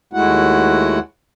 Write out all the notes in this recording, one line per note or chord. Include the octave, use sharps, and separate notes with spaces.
D#2 G#3 A3 E4 F#4 F#5